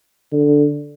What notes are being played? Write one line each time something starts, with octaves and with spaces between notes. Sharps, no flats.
D3